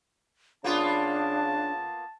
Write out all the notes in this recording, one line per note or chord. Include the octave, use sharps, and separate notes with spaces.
C#3 A#3 B3 D4 F4 A5